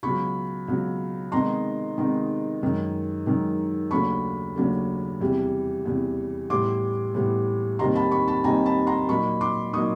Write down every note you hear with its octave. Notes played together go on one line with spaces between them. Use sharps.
C#2 B2 F#3 B5 C#6
C#2 B2 F#3
C3 D#3 G#3 B3 D#4 A#5 C6
C3 D#3 G#3 B3 D#4
F#2 D#3 G#3
F#2 D#3 G#3
D#2 C#3 F#3 A3 D4 B5 C#6
D#2 C#3 F#3 A3 D4
E2 C3 E3 G3
E2 C3 E3 G3
A2 E3 G3 B3 C6 D6
A2 E3 G3 B3
D#2 D#3 G3 C4 D#4 A#5 C6
A5 B5
B5 C#6
A5 B5
D#2 D#3 G3 C4 D#4 G#5 A#5
A5 B5
A#5 C6
A#2 F#3 A#3 D#4 B5 C#6
C6 D6
A#2 F#3 A#3 D#4 C#6 D#6